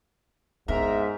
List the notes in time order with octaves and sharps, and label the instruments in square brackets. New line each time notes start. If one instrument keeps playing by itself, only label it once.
[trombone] G#2 [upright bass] B3 E4 [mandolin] A#4 [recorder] E5